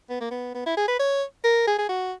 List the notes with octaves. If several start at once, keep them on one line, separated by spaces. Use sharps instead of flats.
B3
A#3
B3
B3
E4
G#4
B4
C#5
A#4
G#4
G#4
F#4